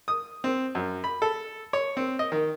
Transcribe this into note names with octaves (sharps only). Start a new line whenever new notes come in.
D#6
C4
F#2
B5
A4
C#5
C4
D#5
D#3